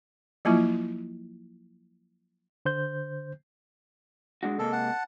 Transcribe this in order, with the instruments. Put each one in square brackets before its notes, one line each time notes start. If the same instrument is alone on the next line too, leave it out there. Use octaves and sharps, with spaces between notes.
[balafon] F3 F#3 A#3 E4 F4
[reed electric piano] D3 C5 G6
[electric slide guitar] G#3 D4 F#4
[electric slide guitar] C3 G#3 A#3 [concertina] A4
[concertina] F#5 A5